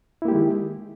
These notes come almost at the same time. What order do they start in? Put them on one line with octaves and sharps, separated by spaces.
E4 A#3 G4 G#3 D#3